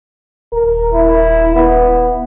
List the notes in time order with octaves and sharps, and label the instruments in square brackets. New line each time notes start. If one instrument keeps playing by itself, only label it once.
[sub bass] D#1 [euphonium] A#4
[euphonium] E4
B3